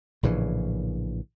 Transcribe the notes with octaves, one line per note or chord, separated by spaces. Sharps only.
A#1 A2 C#3 E3